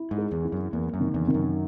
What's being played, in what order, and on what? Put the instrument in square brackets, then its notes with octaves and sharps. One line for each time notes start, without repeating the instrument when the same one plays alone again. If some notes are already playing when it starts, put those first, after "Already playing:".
Already playing: [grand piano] E4
[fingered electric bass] G#2
[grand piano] G#4
[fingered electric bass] E2
[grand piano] E4
[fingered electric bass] F#2
[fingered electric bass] E2 [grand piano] A#3
[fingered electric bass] F#2
[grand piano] D#3
[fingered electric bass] E2
[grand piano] D#3
[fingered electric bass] F#2